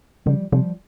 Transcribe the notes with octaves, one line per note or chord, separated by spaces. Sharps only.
C#3 F3 G3
C3 F3 G3